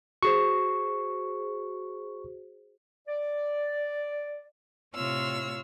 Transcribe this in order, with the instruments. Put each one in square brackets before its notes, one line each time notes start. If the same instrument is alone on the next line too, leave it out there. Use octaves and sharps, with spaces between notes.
[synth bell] F#4 G#4 C5 [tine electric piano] C#6
[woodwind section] D5
[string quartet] A2 C3 F4 C#5 E6 F6